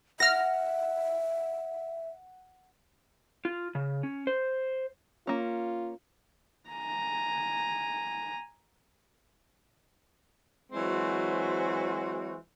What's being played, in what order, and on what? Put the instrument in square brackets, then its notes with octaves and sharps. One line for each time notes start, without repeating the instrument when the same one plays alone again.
[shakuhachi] E5 [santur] F#5 [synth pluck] F6 A#6
[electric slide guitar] F4
C#3
C#4
C5
[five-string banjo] A#3 C#4 [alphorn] F4
[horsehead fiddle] G#5 A#5
[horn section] E3 F#3 G#3 C4 F#4 C5